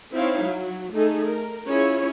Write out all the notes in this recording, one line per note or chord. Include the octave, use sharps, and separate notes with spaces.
C4 D#4 E4 C#5 F5
F#3
A3 D#4 G#4 A4
A#4
C#4 E4 F4 G#4 C#5